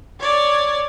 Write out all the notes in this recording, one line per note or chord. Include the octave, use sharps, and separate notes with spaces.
C#5 D5